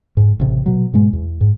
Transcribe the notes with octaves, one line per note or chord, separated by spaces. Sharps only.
G#2
A1 C3
B2 F#3
G#2 B2 G#3
E2
G#2